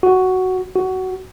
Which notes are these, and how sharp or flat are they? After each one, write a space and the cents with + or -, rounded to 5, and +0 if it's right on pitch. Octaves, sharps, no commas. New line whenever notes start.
F#4 +5
F#4 +15